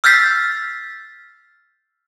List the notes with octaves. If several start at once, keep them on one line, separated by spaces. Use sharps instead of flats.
E6 F6 G6 A6 B6 C7